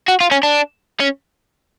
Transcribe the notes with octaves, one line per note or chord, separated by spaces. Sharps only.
F#4
F4
C#4
D4
C#4